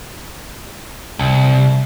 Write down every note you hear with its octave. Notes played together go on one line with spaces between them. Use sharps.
C2